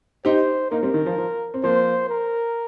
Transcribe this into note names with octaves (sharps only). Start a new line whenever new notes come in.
D#4 G4 C5
A#3 D#4 A#4
G3 C4
D#3
F3
F3
C4
F3 A#3 C5
A#4